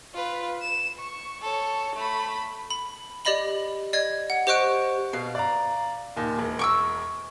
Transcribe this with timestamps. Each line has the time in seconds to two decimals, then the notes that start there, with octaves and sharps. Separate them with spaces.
0.14 F4 B4
0.61 E7
0.98 C#6
1.42 A4 C#5
1.95 A3 B5
2.70 B5
3.25 G4 D5 D#5 B5 F#7
3.93 D5 D#5 G#6
4.30 F#5
4.47 G4 C5 D#5 C#6 F#6 D7
5.13 B2 F5
5.35 D5 A#5
6.16 D#2 A#2
6.39 E1
6.59 C#6 D6 E6